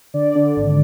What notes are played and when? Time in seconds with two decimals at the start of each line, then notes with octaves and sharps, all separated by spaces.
0.14 D3 D5
0.35 D3
0.56 G#1